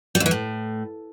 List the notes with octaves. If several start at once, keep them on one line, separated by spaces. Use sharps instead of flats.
G3
F2
E3
A2